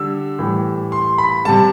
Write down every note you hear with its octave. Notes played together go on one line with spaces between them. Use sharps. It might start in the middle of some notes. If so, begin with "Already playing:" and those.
Already playing: D3 G3 E6
A2 E3 G3
C6
B5
C3 G3 A5